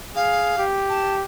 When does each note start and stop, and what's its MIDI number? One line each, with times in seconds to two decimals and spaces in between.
0.15 0.57 68
0.15 0.63 77
0.58 1.25 67
0.88 1.15 81